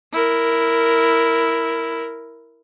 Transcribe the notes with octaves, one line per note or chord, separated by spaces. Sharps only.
E4 A#4